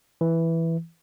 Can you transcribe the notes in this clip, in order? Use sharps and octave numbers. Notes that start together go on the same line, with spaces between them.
E3